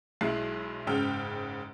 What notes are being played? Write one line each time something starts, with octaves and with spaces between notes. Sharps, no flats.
B1 G#3 E4 F#6 C7
F#1 G#2 C#3 G5 E6 F6